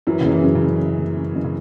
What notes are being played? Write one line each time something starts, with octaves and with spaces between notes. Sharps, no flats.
F#2 E3 F#3
F#1 C#3
E3
F#2
C#3
C#4
C#4
F#1
C#4
F#1
C#3